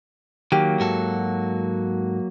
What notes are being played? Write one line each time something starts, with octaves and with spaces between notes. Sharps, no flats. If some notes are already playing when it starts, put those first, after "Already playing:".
D#3 F#3 A#3 G4
G#2 F#4 A4